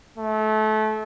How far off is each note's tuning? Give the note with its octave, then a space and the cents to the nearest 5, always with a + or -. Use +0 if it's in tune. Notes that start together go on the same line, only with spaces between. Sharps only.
A3 -25